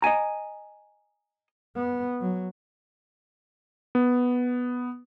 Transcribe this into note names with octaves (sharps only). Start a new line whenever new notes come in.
D#5 E5 G#5 A#5
B3
F#3
B3